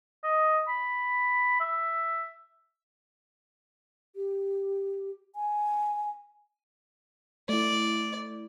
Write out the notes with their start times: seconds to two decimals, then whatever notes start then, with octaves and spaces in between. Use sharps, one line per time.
0.24 D#5
0.68 B5
1.60 E5
4.16 G4
5.36 G#5
7.49 A3 E4 D5